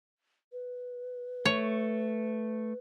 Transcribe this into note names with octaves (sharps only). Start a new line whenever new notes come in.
B4
A3 C#5